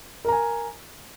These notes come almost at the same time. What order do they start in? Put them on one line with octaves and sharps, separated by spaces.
A#4 A#5 G#5